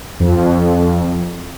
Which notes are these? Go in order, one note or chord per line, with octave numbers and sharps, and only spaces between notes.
F2